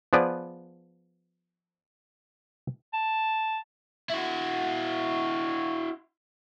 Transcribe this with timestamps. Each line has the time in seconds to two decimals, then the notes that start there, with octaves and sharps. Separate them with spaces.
0.13 F3 B3 G#4 B4 D5
2.93 A5
4.10 E4 F#4